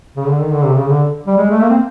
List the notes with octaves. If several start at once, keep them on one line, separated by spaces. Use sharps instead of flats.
C#3
D3
D#3
D3
C3
C#3
D3
G3
G#3
A3
A#3
C4